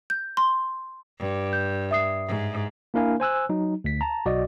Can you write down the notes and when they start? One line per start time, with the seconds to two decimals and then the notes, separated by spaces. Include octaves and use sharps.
0.10 G6
0.37 C6
1.19 G2
1.53 G6
1.91 E5 D#6 C7
2.28 G#2
2.94 A#3 D4 E4 A#4 F5 G#5
3.20 C5 G#5 E6 F#6
3.49 F#3 D#4
3.84 D2 B6
4.01 A5 A#5
4.26 B1 F#4 D5 D#5